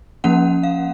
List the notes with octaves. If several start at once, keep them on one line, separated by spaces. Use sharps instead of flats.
F3 A#3 C#4 F#5
F5